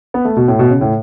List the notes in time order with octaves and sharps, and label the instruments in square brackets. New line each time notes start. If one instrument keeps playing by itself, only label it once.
[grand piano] B3
A3
B2
A2
B2
C#3
A2